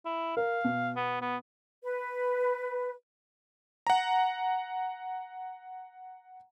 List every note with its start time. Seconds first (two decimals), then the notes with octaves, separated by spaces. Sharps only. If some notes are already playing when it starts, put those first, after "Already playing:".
0.05 E4
0.37 A#4 F5
0.64 B2
0.96 B3
1.22 B3
1.83 B4
3.87 F#5 A#5